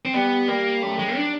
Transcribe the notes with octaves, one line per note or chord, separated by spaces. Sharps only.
C4
G3 B3
G3 A#3
F#2 A3
G#3
D4